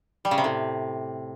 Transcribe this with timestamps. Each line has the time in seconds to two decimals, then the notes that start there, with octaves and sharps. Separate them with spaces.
0.25 G3
0.31 C#3
0.38 C3
0.44 A2